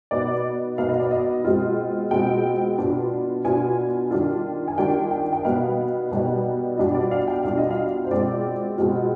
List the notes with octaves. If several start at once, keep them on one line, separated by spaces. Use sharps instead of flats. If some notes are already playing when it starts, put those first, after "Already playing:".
B2 B3 D#4 D5
B2 B3 D#4 F5
D#5
D5
D#5
B2 G#3 C4 F4
B2 G#3 C4 F4 G5
B2 B3 D4 F4
B2 B3 D4 F4 G#5
D#3 G3 D4 F4
G#5
D#3 G3 D4 F4 G5
G5
G5
B2 G3 B3 D#4 F5
B2 G3 B3 D#4
B2 G3 D4 F4 D#5
D5
F5
G5
B2 G3 D4 F4 F5
D#5
F5
C5
B2 G#3 C4 F4 D5
B2 G#3 C4 F4